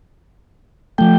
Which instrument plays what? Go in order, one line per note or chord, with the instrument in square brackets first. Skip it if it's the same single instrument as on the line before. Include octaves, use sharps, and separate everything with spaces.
[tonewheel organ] F3 A3 G5